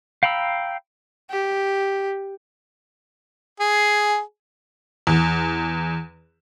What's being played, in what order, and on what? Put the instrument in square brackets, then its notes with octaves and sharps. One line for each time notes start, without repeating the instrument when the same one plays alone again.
[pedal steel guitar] F5 G5 A#5 B5 E6
[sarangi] G4
[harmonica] G#4
[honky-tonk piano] E2